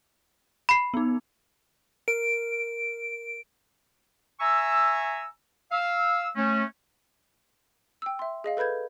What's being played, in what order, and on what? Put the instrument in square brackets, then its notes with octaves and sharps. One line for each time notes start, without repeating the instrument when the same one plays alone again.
[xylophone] B5 C7
[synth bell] B3 D#4
[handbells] A#4 [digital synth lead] D7
[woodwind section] E5 G#5 A#5 C#6 E6
F5 E6
A3 C#4
[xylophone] G5 E6
E5 C6
G#4 D#5 F5
A4 B4 B5 G6 G#6